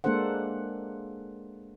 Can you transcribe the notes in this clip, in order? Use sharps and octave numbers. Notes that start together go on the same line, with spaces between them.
G#3 A#3 D4 A4 C5 F#5